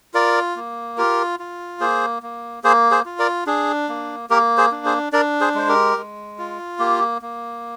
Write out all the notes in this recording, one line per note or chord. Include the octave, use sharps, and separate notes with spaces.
F4 A#4 D5
A#3
F4 G4 A#4
F4
A#3 G#4 C5
A#3
A#3 G#4 C5
G#4 C5
F4
A#4 D5
D4 G#4
A#3
A#3 G4 A#4
G#4 C5
D4
G#4 C5
D4 A#4 D5
G#4 C5
G#3 C5
G4 A#4
G#3
F4
A#3 G4
A#3